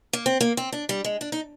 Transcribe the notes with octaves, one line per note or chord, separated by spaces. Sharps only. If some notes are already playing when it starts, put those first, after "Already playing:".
A#3
C4
A#3
C4
D4
G3
G#3
D4
D#4